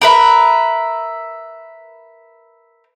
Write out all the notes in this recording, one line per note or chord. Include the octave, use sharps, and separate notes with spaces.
A#4 B4 E5